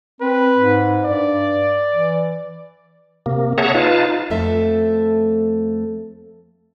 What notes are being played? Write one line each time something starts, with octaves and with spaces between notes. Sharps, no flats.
C4 B4
G#2
G2 D5
E3
C3 A#3
G#4 C#5 E5 F#5 A5 A#5
D#4 F4 B4 F5 A5
F2 A3 A4 E5